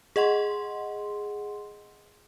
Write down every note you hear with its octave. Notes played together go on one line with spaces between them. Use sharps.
G#4 D#5 F#5 C6